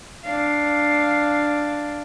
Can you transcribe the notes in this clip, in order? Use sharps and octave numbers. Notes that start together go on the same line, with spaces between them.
D4 F5